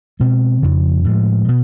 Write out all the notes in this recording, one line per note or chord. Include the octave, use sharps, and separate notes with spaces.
B2 G#3 C4
F2 C#3 F3
A2 F3 G#3
B2